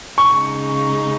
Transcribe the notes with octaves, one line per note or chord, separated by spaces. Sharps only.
C#3 G#3 D#4 C#6